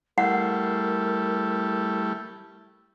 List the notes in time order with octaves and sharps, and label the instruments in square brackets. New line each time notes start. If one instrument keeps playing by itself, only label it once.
[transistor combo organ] G3 A3 E4 [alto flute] A#4 [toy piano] F#5